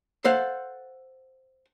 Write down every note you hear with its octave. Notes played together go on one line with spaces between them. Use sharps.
A4 C5 F5 F#5